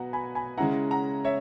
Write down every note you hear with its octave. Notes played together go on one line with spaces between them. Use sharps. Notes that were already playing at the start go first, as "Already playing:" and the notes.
Already playing: B2 F#3 B3 F#5 A#5
G#5 B5
G#5 B5
C#3 G#3 C#4 E4 F#5 A#5
F#5 A#5
C#5 E5